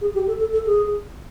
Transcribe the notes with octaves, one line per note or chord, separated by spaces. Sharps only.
G#4
G4
A4
A4
A4
G#4